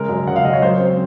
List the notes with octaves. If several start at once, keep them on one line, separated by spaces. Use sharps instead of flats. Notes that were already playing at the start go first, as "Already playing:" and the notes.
Already playing: C#3 G#3 A#4
F#2
C#3 F#5
F5
F#2 D#5
C#5
F#3 C5
C4